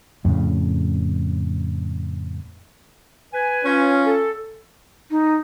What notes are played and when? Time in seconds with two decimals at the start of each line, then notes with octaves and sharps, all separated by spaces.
0.25 F2 A2 C#3
3.33 B4 G#5
3.65 C#4 F4
4.05 A4
5.11 D#4